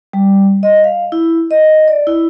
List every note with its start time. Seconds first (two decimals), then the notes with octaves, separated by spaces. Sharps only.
0.13 G3
0.63 D#5
0.84 F5
1.12 E4
1.51 D#5
1.88 D5
2.07 E4